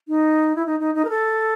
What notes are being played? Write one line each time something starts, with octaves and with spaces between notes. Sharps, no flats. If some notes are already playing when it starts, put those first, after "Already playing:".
D#4
E4
D#4
D#4
D#4
A#4
A4